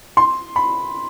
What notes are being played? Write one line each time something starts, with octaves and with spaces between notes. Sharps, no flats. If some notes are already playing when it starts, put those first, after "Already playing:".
C6
B5